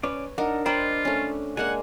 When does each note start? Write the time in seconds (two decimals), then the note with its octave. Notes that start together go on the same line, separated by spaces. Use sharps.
0.03 C#4 B4 C#5 D5
0.38 D4 D#4 A#4 D#5 F#5
0.66 F4 C5 D5 D#5 G5 A#5 B5
1.05 A3 C#4
1.57 G#3 A#3 D4 F#5 G#5